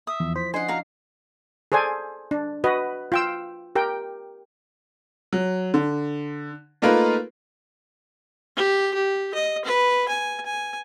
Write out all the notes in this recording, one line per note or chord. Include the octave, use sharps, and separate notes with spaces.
E5 D#6
E2 F3
E4 C5 B6
C#4 D4 C5 D#5 F#5 G#5 C7
F#4 F5 A#5
G#4 A4 C5 D5 G#5
D4
F#4 B4 D#5
F4 G5 E6
G4 A#4 G5
F#3
D3
A3 A#3 D#4 F4 A#4 B4
G4
G4
D#5
B4
G#5
G#5